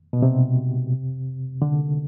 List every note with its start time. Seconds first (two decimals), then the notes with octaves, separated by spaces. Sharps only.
0.13 B2
0.22 C3
1.62 D3